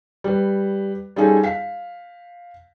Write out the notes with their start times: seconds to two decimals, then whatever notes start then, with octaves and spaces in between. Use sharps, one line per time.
0.24 G3 B4
1.16 G3 C#4 D#4 F4 G#4 A4
1.43 F5 B6